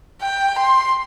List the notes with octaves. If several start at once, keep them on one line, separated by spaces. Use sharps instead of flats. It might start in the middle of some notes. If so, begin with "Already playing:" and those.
G5
C6